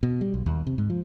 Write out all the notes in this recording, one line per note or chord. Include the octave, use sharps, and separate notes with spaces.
B2
G3
B1
D#2
C3
G#2
F3